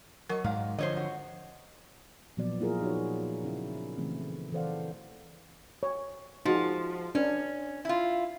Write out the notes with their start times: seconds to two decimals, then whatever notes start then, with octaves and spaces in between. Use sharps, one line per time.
0.29 F#3 A#4 C#5 D#5 C#6
0.44 G#2 D5 F5 A#5
0.78 D3 F3 C5 C#5 D#5
0.96 F#4
2.37 A#2 F3 F#3 B3 D5
2.60 A#3 E4 F4 G#4 A#4
2.81 D#4 F#4 C#5
3.43 C#3 C#4 E4
3.97 C#3 E3 A3 C4
4.53 E3 A4 C5 D5 F5 F#5
5.83 C#5
6.45 F3 D#4 F#4 G#4
7.15 C#4 D4 B4
7.85 E4 F4